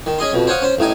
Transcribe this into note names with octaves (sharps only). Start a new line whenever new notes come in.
D#3
C#4 G#4 D#5 C6
F2 B2
C5 C#5 F5 F#5 D#6
C#4 C5
A1 A2 D#4 G#5